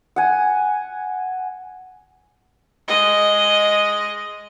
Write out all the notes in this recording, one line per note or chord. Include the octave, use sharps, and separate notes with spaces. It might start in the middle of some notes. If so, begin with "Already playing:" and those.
F#5 G#5
G#3 D#5